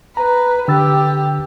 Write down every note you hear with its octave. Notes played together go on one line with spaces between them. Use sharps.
B4 A#5
D3 G4 E6 A6